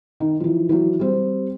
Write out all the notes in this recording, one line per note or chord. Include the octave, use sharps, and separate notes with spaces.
D#3
E3 F3
E3 F#3
G3 C4